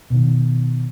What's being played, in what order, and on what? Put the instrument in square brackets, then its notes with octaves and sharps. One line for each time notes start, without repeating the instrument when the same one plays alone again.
[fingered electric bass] B2 D#3